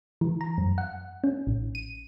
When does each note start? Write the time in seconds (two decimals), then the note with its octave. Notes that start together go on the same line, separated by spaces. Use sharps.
0.21 E3
0.41 A#5
0.58 F#2
0.78 F#5
1.24 C#4
1.47 A1
1.75 D#7